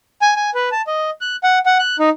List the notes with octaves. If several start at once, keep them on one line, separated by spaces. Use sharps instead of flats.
G#5
G#5
B4
A5
D#5
F#6
F#5
F#5
F#6
D#4